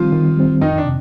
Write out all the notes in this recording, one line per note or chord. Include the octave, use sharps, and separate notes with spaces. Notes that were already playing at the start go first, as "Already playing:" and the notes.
Already playing: D#3 F3 G3 C4 F4
D#3
G3 C4
F2 D#3 D#4
D4
C3